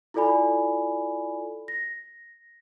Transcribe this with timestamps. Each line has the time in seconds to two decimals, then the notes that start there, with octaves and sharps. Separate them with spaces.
0.14 E4 F4 A4 D5 G#5 B5
1.68 A#6